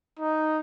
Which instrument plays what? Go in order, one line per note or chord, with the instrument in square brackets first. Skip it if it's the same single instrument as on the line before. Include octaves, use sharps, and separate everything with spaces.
[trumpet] D#4